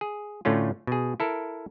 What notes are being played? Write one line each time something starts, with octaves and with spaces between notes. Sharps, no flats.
G#4
A2 D3 A3 C#4 F4
B2 G#4
E4 A4 A#4